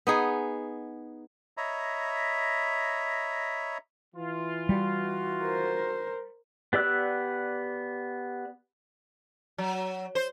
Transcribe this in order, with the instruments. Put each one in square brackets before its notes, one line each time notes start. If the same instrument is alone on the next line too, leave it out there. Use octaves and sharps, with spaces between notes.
[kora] B3 D#4 G#4
[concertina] C#5 D#5 E5 A#5 B5
[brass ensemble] E3 F4
[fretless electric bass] G3 [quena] F#4
[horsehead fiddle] A#4 C5
[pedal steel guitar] B3 G4 D5 E6 F#6
[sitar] F#3
C5